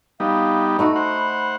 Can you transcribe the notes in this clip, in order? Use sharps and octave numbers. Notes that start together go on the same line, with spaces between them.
G3 B3 D#4 F5
A3 D#4 F#4 B5
C5 F#5